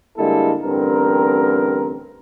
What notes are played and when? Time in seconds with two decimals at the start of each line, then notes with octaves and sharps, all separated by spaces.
0.16 D3 G3 G#3 A#3 E4 A4
0.63 A1 G2 D3 C4 A#4